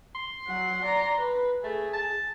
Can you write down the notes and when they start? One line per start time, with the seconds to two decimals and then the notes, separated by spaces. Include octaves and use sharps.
0.15 C6
0.47 F#3 F#5
0.82 D5 A#5
1.17 B4
1.64 A3 G#4
1.93 A5